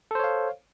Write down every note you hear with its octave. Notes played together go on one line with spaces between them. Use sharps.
A4 C5 C#5 F5